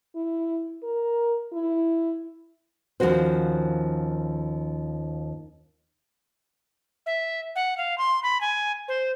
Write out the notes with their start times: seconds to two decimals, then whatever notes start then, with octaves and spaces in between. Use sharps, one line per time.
0.15 E4
0.83 A#4
1.53 E4
3.00 D#2 F3 C#4 F#4 C5
7.06 E5
7.56 F#5
7.78 F5
7.98 C6
8.23 B5
8.41 G#5
8.88 C5